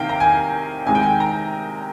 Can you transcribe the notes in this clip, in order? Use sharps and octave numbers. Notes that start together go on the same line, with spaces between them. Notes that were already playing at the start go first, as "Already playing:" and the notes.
Already playing: C3 D#3 A#3 F5 G5
A#5
G#5
C3 D#3 G#3 G#5
G5
G#5
A#5